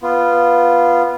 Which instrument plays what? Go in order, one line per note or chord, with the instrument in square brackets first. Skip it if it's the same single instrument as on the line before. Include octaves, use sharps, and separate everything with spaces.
[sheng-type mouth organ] B3 F4